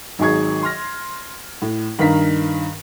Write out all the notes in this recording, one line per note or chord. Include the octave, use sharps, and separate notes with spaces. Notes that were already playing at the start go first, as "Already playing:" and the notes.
G#1 D#3 F#3 G#4 C#6 G#6
C6 F6 A#6
A2
G2 D#3 A#4 F5 B6